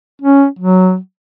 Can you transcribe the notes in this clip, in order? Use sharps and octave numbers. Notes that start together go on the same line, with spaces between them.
C#4
F#3